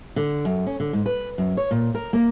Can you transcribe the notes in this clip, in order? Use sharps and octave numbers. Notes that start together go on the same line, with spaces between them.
D3
F#2
C#4
D3
G#2
B4
F#2
C#5
A#2
A#4
A#3